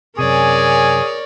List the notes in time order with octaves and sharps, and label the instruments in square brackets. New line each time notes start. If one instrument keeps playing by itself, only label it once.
[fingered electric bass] F#2 C3 [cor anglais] G#4 [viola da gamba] A#4 C#5 D5 [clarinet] G#5